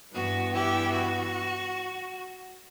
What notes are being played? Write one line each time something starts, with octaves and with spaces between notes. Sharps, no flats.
G2 E3 B3 F#4
E4 G4
F#4